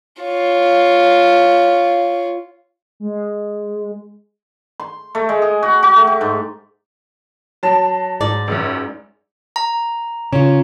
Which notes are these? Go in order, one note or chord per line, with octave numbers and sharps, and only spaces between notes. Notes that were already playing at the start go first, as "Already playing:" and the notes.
F4 C#5
G#3
C6
A3
G#3
G#4
F#4
F#4
A3
G4
G#2
F#3 A5
G#2 D5
C#2 F#2
A#5
C#3 C#4 F4